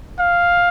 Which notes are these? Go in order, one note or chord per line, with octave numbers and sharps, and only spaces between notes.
F5